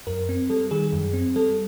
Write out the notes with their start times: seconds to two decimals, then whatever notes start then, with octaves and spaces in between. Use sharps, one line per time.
0.07 F#2 A#4
0.29 C4
0.50 G3 A4
0.71 D#3 G#4
0.93 F#2
1.13 C4
1.36 G3 A4